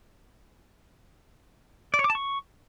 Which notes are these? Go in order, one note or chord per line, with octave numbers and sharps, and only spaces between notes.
D5
C#5
D6
A5
C#6